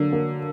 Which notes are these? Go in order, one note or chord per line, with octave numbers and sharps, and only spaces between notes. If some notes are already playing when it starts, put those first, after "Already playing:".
Already playing: D3 F#3 A#3
A#3